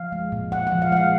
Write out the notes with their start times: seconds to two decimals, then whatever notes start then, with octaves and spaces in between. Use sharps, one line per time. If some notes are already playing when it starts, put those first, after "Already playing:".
Already playing: F3 F5
0.12 G#3
0.32 A#2
0.52 A#2 F#5
0.67 F#5
0.72 F3
0.82 F5
0.92 G#3 F#5
0.97 F5